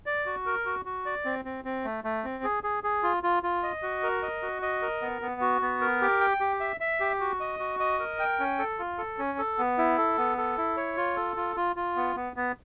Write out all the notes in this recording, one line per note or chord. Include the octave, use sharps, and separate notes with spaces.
D5
F#4
A#4
F#4
F#4
D5
C4
C4
C4
A3
A3
C4
G#4
G#4
G#4
F4
F4
F4
D#5
F#4
A#4
D#5
F#4
D#5
A#4
B3
B3
F#4
B3
A#4
G4
G5
G4
E5
E5
G4
F#4
D#5
F#4
D#5
A#4
G5
C#4
A4
F4
A4
C#4
A4
B3
E4
A4
B3
A4
E4
C#5
F4
A4
F4
F4
F4
B3
B3
B3